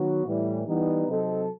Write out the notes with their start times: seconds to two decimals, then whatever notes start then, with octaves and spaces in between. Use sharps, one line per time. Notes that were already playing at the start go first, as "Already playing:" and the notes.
Already playing: D#3 F#3 B3 F#4
0.26 A2 E3 G3
0.66 E3 G3 B3 D#4
1.07 C3 F#3 C4 D#4 A4